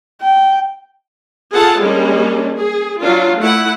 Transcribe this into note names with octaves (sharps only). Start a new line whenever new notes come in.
G5
F4 G#4 A4 F#5 A5
G3 G#3 A#3 C#4 D4
G#4
F#3 D4 F4
A3 E4 F#5